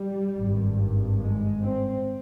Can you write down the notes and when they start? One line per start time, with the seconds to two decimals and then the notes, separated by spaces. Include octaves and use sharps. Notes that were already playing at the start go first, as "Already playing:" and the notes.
Already playing: G3
0.37 G#1 G2
1.20 G#3
1.62 C4